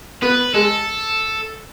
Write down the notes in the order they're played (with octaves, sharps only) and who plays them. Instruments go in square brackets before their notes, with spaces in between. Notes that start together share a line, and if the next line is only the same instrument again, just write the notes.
[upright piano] B3 [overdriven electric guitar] B4
[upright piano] G#3 [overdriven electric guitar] A4